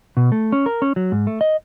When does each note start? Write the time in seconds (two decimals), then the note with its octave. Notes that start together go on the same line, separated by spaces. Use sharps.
0.17 B2
0.32 A3
0.52 C#4
0.66 A#4
0.82 C#4
0.96 F#3
1.12 G#2
1.27 A3
1.41 D#5